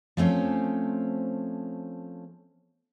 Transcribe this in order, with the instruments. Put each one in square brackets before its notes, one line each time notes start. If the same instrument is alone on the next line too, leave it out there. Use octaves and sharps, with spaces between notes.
[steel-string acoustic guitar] F3 A3 C4 C#4